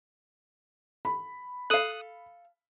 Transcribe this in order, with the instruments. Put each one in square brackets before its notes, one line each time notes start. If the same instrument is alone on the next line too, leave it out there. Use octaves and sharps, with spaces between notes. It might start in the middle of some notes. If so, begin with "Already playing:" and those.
[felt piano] B5
[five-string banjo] A4 F5 [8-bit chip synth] D#6 F#6